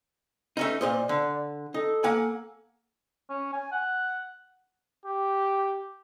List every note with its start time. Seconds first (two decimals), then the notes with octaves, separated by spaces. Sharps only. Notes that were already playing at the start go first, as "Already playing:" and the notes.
0.57 A3 C#4 D#4
0.81 A#2 C5 D5 D#5
1.09 D3
1.74 D#4 A4
2.04 A#3 F#5 G#5
3.30 C#4
3.53 G#5
3.72 F#5
5.06 G4